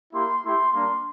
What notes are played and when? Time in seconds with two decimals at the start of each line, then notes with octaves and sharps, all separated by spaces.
0.13 A#3 E4 G4 C6
0.44 A3 E4 G4 C6
0.73 G3 A#3 D4 C6